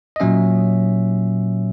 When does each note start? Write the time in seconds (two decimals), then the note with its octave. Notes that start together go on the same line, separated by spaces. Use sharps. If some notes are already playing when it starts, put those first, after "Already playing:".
0.16 D#5
0.20 A#2 F#3 C#4 E5